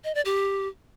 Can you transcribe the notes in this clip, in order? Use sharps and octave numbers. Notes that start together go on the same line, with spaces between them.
D#5
D5
G4